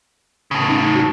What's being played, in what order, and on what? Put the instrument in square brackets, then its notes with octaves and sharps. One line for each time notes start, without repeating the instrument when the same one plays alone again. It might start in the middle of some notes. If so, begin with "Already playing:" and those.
[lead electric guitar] A2 C#3
[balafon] C#4 D#4
F#4